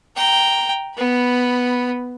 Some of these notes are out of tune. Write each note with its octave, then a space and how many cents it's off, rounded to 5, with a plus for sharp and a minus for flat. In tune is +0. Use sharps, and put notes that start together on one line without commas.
G5 -5 A#5 +0
B3 +0 B5 -5